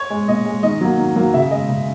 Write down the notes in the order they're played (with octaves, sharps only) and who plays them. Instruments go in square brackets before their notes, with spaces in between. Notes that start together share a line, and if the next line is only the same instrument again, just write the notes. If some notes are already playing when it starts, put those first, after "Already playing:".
Already playing: [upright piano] C#5
G#3
A#2 D#5
G#3
D#3 D#5
F#3 A#3
D#3
F#3 A#3
C#3 E5
G#3 D#5
C#3